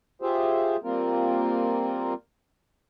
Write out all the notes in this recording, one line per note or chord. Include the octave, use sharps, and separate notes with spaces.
F4 G4 G#4 C5 E5
G3 A#3 C4 F4 A#4